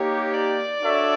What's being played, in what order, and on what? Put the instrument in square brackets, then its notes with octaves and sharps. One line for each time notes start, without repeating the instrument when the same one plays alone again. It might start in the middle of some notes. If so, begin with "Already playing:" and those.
Already playing: [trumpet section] A#3 D#4 G4 [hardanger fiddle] C#5
[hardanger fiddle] D5
[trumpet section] D4 F#4 A4 C#5 E5